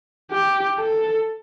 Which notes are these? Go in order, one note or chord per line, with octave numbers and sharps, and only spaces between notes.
G4
A4